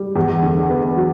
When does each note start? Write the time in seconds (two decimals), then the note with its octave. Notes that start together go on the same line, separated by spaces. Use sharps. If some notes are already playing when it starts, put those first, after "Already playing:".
Already playing: G3
0.16 E2
0.43 D3
0.70 B3
0.96 F#3